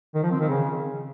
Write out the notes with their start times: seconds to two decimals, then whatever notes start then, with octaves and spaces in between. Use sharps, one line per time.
0.14 D#3
0.23 F3
0.31 C4
0.40 D#3
0.48 C#3